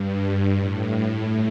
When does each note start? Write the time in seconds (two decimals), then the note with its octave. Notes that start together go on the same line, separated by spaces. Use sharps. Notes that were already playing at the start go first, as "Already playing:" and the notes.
Already playing: G2
0.57 A2